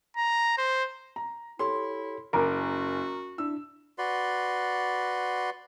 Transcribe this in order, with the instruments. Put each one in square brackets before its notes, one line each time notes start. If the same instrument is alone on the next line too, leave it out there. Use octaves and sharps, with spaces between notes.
[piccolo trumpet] A#5
C5
[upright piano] A#5
[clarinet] E4 [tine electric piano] G4 A4 C#5 [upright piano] C6
[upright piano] F#1 [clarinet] F#4 [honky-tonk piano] A#4 [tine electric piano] G#5 D6
[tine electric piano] D4 E4 [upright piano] E6
[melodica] F#4 B4 D5 C6